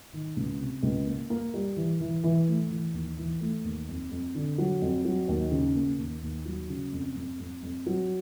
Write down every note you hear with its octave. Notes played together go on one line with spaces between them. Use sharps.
D#3
C#2
C3
C#2
A#3
A#3
G3
E3
E3
E3
A3
E3
D#2
E3
A3
D#2
F2
F2
D3
F#3
F2
F#3
D#2
C#3
A#3
D#2
D#2
F#3
C#3
F2
F2
F2
F2
F#3